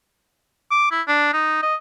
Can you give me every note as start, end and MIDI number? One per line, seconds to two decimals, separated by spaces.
0.71 0.88 86
0.91 1.02 64
1.08 1.32 62
1.33 1.61 63
1.63 1.75 75